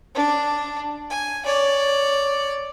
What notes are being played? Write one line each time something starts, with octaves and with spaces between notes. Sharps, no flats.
D4
G#5
C#5 D5